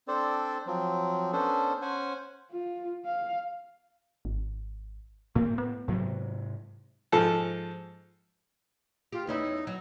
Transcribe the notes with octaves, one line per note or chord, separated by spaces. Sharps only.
C4 D4 A4 C5 D5
F3 F#3 C4
B3 C#4 D4 A4 C5
C#4 C5 F#5 G#5
F4
F5
G#1
A2 A#3 C4
B3
G#2 C3 F#3
G#2 F3 A4
F4 G4
E2 C#4 D#4 E4
F#3